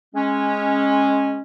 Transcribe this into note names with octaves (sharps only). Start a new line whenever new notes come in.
G#3 C#4